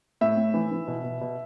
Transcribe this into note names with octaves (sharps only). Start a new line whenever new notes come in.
A2 E5
A2
E3
E3
B2
B2
B2